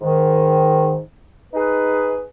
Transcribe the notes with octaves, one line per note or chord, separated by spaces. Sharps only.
G#2 D#3
D#4 G#4 B4